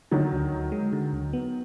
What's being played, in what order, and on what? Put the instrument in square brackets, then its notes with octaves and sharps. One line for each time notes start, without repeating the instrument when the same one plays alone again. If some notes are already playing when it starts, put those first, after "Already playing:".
[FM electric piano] D3 [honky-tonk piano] D#3 F#3
[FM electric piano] D2
D2
G#3
D3
D2
B3